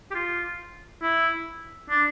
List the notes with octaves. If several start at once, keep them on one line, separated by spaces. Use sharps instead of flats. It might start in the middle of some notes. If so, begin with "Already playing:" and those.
G4
F4
E4
D4